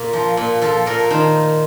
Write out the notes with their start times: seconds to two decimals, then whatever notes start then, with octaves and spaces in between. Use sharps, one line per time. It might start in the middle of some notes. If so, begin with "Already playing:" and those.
Already playing: A#2
0.13 F3
0.37 A#2
0.62 F3 A4
0.86 A#2 A#4
1.10 D#3 C5